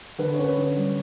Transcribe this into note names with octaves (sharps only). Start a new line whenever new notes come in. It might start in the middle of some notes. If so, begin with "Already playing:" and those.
D3 B4
C#4 C#5
B4
D3
G3